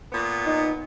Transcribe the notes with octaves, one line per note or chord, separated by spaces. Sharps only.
A#2 B3
D#4